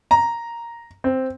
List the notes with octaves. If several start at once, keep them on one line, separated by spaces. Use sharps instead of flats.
A#5
C4